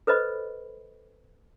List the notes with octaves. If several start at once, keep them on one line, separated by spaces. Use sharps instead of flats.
A4 B4 C5 D#5 B5